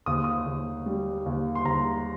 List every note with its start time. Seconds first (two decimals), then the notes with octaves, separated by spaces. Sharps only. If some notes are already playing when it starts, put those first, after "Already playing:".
0.06 D#2 D#6
0.24 D#6
0.46 D#2
0.86 G3
1.26 D#2
1.55 C6
1.65 D#2 A#5